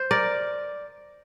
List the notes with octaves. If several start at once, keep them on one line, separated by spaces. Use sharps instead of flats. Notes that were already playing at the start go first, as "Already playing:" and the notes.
Already playing: C5
A#4 D5